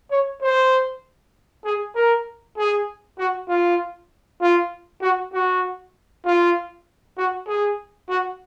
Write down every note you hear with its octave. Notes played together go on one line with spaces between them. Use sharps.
C#5
C5
G#4
A#4
G#4
F#4
F4
F4
F#4
F#4
F4
F#4
G#4
F#4